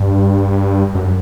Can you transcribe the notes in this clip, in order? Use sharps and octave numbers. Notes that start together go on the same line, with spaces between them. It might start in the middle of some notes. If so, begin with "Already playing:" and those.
Already playing: G2
F#2